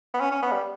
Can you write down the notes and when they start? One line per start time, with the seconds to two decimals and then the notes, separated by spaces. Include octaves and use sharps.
0.14 B3
0.20 C#4
0.31 C#4
0.42 B3
0.52 G3